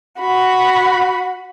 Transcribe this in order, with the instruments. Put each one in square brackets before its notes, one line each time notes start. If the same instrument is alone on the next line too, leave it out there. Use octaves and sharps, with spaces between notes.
[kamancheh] F#4 B5